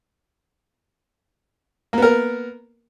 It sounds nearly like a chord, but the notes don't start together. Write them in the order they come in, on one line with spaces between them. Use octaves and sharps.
A#3 B3 A#4